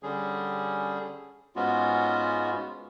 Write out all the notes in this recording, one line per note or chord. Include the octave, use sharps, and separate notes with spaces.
D3 G3 C#4 G#4
G#2 G#3 B3 C#4 F4 F#4